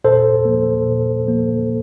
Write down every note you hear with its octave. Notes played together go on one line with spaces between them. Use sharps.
A#2 A4 C5
F3 A#3
A#2
F3 A#3